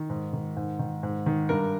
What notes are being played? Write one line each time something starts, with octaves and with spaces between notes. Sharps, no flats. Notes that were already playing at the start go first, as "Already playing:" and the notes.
Already playing: D#3
G#2
D#3
G#2
D#3
G#2
D#3
G2 A#4